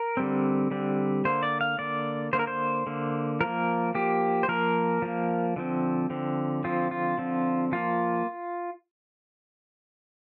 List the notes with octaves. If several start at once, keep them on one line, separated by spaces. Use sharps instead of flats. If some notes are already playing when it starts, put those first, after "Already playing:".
Already playing: A#4
D3 G3 C4
D3 G3 C4
D3 A#3 C5
D5
F5
D3 A#3 D5
D3 A#3 C5
A#4
C5
D3 A#3
F3 A#3 A#4
F3 A#3 G4
C5
F3 A#3 A#4
F3 A#3
D3 F3 C4
D3 F3 C4
D3 F3 C4 F4
F4
D3 F3 C4
F3 A#3 F4